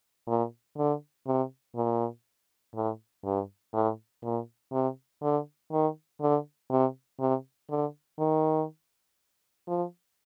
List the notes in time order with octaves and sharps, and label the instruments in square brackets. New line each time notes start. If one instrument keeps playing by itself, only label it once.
[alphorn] A#2
D3
C3
A#2
A2
G2
A2
A#2
C3
D3
D#3
D3
C3
C3
D3
D#3
F3